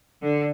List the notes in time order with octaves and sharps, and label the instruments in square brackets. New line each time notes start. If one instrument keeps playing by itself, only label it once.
[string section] D3